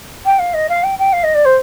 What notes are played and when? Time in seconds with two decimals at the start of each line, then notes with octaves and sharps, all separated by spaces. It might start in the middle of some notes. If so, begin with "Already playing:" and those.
0.25 G5
0.39 F5
0.54 D#5
0.69 F5
0.83 G5
0.99 G5
1.13 F5
1.23 D#5
1.34 D5
1.45 C5